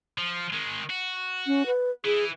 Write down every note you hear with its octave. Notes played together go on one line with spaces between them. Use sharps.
F3
D#3 G#3
F#4
C#4
B4
E3 G#4